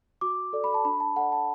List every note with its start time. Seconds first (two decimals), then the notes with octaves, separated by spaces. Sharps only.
0.21 F#4 D6
0.53 A4 D5
0.64 B5
0.74 A5
0.85 D4 B5
1.00 A5
1.16 A4 D5 F#5
1.32 A5